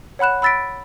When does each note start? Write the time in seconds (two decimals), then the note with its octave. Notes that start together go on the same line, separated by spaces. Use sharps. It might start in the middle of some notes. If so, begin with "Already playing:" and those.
0.19 C#5 F#5 B5 F#6 E7
0.42 B5 E6 A6 B6 D7